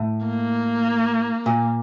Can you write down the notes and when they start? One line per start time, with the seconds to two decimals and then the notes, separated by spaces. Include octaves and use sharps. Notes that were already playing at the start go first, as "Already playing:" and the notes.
Already playing: A2
0.27 A#3
1.46 A#2